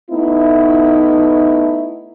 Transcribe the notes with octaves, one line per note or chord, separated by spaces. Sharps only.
A3 B3 D#4 E4